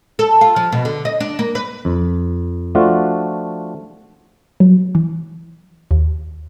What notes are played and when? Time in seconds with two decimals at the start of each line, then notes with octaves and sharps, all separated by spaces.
0.19 A4
0.41 F4
0.56 F3
0.72 B2
0.85 D3
1.05 D#5
1.20 D4
1.39 A#3
1.55 B4
1.85 F2
2.75 F3 A3 D4 F4 F#4
4.60 F#3
4.95 E3
5.91 D#2